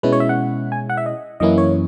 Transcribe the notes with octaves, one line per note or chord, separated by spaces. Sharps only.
B2 G#3 C#4 E4 B4
C#5
E5
F#5
G#5
F#5
E5
D#5
F#2 E3 A#3 C#4 E4 D#5
C#5